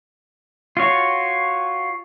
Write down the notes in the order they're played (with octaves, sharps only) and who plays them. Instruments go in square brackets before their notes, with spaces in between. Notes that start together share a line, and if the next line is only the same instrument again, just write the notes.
[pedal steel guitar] F4 F#4 C#5